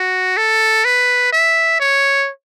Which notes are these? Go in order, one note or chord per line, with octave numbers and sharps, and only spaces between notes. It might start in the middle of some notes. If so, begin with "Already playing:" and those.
Already playing: F#4
A4
B4
E5
C#5